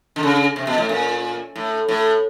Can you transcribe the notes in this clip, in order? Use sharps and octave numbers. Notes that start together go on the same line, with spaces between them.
D3
C#3
C3
B2
A2
A#2
A2
A2